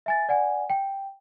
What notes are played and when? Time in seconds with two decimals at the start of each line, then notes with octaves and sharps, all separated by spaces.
0.06 E5 G#5 A6
0.29 D5 F#5 G#5
0.70 G5